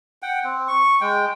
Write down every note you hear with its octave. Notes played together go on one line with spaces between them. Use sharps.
F#5 G5
C4
C#6
G#3 G5